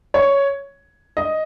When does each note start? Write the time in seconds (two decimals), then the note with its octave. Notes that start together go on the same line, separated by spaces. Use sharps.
0.14 C#5
1.17 D#5